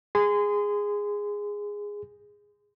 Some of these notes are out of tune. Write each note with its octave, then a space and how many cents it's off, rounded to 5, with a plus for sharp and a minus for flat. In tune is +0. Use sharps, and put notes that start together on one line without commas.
G#4 -10 C6 -35